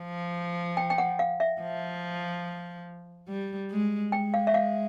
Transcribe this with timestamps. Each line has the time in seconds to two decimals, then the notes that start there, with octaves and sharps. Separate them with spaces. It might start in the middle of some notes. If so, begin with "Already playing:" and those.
Already playing: F3
0.77 G5
0.90 G5
0.98 F#5
1.19 F5
1.40 E5
1.61 F3
3.29 G3
3.70 G#3
4.12 G#3 G5
4.34 F5
4.47 E5
4.54 F5